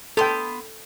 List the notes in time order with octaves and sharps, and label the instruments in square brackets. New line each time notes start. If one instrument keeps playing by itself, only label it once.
[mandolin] B3 C6 [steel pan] A4 G5